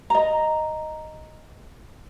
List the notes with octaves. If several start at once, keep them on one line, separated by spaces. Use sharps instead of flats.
D#5 A#5